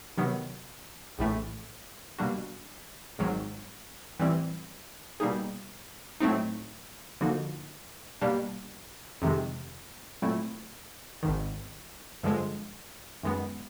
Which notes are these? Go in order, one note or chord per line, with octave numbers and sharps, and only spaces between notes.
C3 D#3 F#3 B3
A#1 A2 E3 A3
B2 G3 A#3 D4 F#4
G#1 G#2 D#3 F#3
A2 E3 G3 C4 E4
B2 G3 A#3 D#4 G#4
A2 F#3 A3 C4 D#4
D3 F3 A#3 D#4 F#4
B2 G3 A#3 D4 G4
F2 C3 D#3 G#3
A#2 F#3 A3 C4 E4
G#1 G#2 D#3
G2 D3 F3 G#3
F#2 D#3 G#3 B3